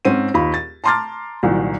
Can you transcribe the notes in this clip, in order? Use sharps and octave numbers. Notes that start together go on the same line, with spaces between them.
G#2 C4 C#4 D#7
D#2 F4 B5
A6
A5 A#5 C6 D6 F6 A6
C2 A#2 D#3 F#3